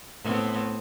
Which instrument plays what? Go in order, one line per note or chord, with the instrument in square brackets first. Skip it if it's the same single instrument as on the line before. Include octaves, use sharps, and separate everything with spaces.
[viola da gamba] A2 B3 C4